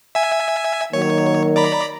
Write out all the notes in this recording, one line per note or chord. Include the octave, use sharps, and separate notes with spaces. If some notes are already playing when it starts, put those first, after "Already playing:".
E5 G#5
D#3 F#3 A#3 C#5
D5 A#5 B5